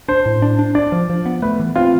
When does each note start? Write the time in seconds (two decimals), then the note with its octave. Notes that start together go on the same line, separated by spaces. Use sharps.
0.08 D4 C5
0.26 A2
0.42 D4
0.59 D4
0.75 D4 D5
0.92 F3
1.09 F3
1.26 B3
1.42 A3 B4
1.60 E3
1.76 C4 F4